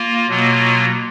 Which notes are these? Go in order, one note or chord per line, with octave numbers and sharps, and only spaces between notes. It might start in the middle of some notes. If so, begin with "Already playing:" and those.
Already playing: A#3 F4
B2 F#3 A#3 F4